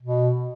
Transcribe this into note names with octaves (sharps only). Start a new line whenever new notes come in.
B2